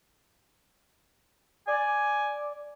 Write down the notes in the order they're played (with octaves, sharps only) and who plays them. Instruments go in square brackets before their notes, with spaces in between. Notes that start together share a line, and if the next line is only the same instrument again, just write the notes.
[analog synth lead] D5 [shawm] G#5